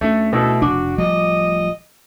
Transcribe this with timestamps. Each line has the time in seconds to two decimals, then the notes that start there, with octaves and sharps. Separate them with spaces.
0.01 D2 A3 C#4
0.33 B2 A3 E4 A4
0.62 F1 D4 F#4 D6
0.98 D1 F3 G3 D#5